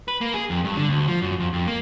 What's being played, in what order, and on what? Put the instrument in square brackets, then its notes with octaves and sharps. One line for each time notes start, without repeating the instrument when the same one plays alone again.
[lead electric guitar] B4
A#3
G#4
F2
G2
D3
D2
F3
F#2
F2
F2
A#3